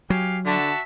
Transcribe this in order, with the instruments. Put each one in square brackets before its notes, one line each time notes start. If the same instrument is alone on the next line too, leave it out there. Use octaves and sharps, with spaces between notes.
[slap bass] F#3 [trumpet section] G4 G#5 [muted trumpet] F5
[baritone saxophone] D3 [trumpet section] F#4 A5 [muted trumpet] E5